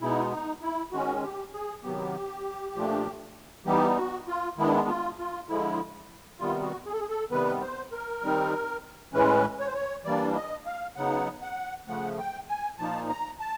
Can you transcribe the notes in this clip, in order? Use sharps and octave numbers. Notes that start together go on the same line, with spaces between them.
B2 G#3 B3 D#4 E4
D#4
E4
D#3 G#3 C#4 F#4
G4
G#4
C3 D#3 F#3 B3 G4
A#2 F3 A3 D4
E3 G3 B3 D#4 G4
F#4
F4
D#3 G#3 B3 D4 E4
F4
F4
D3 F3 G#3 E4
C3 D#3 G3 B3 F4
F#4
G#4
A4
G#4
A4
C3 D#3 G3 B3 B4
C5
A#4
D#3 G3 C4 D#4
A2 E3 G#3 C#4 B4
C#5
C5
C#5
E3 G3 A#3 D4 D5
D#5
F5
C#3 F#3 B3 D#4 F#5
F#5
C#3 F3 A3 F#5
G5
G#5
A#2 F3 A#3 D#4 A5
A#5
A5